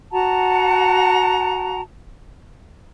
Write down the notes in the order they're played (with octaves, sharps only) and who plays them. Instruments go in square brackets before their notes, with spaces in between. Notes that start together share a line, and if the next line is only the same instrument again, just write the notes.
[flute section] F#4 F#5 A5 A#5